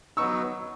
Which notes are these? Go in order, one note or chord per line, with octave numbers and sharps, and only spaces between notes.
F#3 B3 D#4 C#6 E6